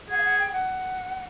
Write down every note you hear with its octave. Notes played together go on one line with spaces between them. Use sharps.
G#4 F#5
F5
F#5
G5
F#5